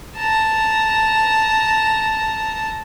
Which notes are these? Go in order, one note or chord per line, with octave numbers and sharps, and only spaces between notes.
A5 A#5